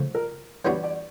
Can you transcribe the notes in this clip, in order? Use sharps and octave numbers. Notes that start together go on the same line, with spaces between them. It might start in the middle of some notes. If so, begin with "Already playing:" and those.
Already playing: C#3 F3 A3
A#4
E3 G3 B3 D4 F#4 C#5
D5